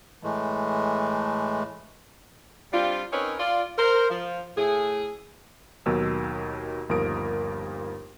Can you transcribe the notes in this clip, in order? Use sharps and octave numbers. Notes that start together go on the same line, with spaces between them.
A2 E3 G#3 A3
G3 C4 D4 F4
C4 C#4 D#4 A#4 B4 C#5
F4 D5
A#4 C5
F3
A2 G#4
D#2 B2 D#3 F#3 E6
G1 D#2 F3 A#4 D#6 D7